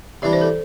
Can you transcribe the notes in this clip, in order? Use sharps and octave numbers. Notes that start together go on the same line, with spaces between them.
C3 E3 G3 D4 D5
C5
A4